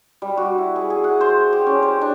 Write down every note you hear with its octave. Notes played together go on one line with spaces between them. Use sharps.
G3
F#4
E4
G#4
G#4
F#5
C5
G4
C#4
C5
D4